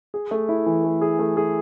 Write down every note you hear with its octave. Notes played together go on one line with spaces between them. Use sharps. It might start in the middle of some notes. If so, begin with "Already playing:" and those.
G#4
A3
E4
E3
A3
G#4
A3
G#4